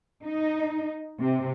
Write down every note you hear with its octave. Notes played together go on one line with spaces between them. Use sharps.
D#4
C3